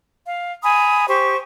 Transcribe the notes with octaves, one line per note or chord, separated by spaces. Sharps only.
F5
G#5 A#5 B5 D#6
G4 C5 C#6